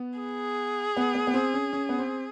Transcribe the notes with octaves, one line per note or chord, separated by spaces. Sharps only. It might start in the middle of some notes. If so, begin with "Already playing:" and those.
Already playing: B3
G#4
B3
B3
B3
C4
C#4
C#4
B3
C4